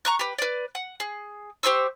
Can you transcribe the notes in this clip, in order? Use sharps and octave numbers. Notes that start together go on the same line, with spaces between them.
A#5 C#6 F#6
G4 B4
B4 D5
F#5
G#4
G4 C5 C#6 E6